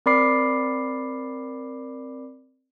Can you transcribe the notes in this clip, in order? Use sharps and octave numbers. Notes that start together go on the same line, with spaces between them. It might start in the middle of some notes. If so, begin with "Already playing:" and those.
C4 A#4 D5 B5 D6 C7